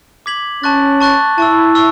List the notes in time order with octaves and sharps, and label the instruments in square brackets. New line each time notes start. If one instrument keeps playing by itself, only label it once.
[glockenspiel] D6 G#6 B6 F#7
[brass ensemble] C#4 [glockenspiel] A5 C#6 F#6 A6
[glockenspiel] A5 C#6 F#6 A6
[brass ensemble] E4 [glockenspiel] A5 C#6 E6
[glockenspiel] C#6 E6